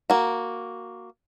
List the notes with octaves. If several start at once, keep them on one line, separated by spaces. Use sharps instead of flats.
A#3 F#4